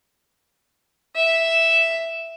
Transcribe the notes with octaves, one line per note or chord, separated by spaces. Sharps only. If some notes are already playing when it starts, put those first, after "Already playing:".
E5